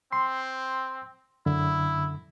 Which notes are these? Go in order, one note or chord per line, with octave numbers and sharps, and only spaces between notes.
C4 C6
F#2 D3 E4